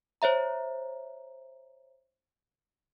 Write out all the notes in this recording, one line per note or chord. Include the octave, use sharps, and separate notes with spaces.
C5 C#5 E5 A#5